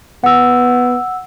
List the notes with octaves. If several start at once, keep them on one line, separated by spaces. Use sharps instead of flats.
B3 F#5 E6